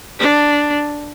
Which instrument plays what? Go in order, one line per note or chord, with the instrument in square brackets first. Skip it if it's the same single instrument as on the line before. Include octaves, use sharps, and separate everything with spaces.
[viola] D4